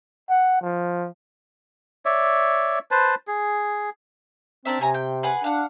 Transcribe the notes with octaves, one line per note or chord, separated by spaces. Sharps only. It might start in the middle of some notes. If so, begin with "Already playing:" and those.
F#5
F3
C#5 D5 E5
B4 C5 A5
G#4
C4 D4 A#4 E5
C3 C#5 G#5 A#5
G5
G#4 B4 F#5
D4 F5 F#5